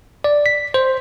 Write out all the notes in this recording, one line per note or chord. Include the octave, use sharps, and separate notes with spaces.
D5
B6
C5